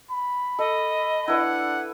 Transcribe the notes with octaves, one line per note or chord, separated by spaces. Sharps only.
B5
A4 D#5
D4 E4 B4 E5 F#5